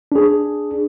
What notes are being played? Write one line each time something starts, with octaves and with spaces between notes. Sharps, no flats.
D4 G#4